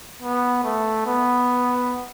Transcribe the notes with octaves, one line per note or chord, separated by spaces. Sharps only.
B3
A3
B3